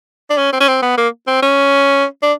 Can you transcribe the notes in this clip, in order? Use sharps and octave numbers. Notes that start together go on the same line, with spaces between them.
D4
C#4
C4
C#4
C4
B3
A#3
C4
C#4
D4